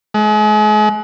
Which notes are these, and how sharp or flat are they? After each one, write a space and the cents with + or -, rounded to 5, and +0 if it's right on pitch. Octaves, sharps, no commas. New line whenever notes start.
G#3 +40